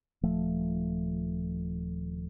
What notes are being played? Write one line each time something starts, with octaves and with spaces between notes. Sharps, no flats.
D#1 F3 A3